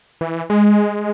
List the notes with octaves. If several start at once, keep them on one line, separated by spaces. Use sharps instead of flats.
E3
G#3